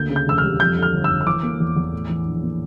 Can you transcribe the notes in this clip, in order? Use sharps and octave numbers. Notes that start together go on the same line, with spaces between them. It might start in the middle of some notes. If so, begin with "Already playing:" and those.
Already playing: D2 A#3 G6
C#3
G6
E1 E6
F6
G3
F2 G6
D3
F6
G1
E6
G1
E6
E3 D6
A#3
E2
E2
A2
E3
A#1
A#3